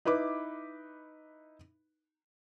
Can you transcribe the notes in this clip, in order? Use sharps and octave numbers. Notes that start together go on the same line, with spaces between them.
D#4 E4 B4 B5 D6